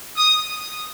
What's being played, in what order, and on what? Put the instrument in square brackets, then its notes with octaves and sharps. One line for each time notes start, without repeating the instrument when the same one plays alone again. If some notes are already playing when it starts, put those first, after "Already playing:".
[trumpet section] D#6